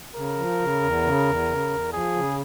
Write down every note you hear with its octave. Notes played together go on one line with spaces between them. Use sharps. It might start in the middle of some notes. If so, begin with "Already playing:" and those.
C#3 A#4
F3
C#3
E2
C#3
E2
C#3
E2
F3 G#4
C#3